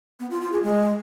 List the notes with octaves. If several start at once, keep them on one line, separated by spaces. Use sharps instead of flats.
B3
F4
F4
G#4
G#3